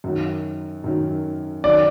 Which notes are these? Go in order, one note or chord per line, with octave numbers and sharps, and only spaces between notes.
F#2 D#3 F#3
F#2 D#3 F#3
F#2 D#3 F#3 D5